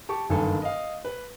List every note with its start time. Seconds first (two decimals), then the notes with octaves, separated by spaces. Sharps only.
0.09 G4 A5 C#6 D6
0.29 F#1 G2 D3 D#3 A4 G#5
0.62 D#5 F5
1.04 B4